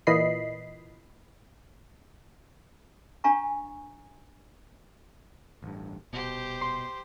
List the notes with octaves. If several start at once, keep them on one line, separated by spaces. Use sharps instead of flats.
A#2 E3 D#5 B5 C7
D4 F5 G#5 A#5 C#6
A1 G2
D#1 B2 G4 C5
C6